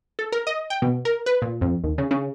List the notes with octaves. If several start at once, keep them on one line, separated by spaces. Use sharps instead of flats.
A4
A#4
D#5
G5
B2
A#4
B4
A#2
F2
D#2
C#3
C#3